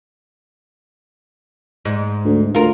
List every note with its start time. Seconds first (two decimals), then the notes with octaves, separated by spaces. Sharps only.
1.85 G#2
2.25 D2
2.55 D2 F4 A#4